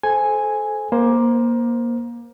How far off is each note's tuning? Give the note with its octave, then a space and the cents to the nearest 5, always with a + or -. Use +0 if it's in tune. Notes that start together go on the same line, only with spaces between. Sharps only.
A4 -25 C5 +0 G#5 +0
A#3 +20 C5 +0